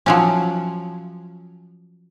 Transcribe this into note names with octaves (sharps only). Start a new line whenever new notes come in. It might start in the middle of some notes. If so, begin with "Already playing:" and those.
F3 F#3 C#4